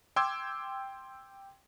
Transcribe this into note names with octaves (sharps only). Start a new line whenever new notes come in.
G5 C6 D6 E6 G#6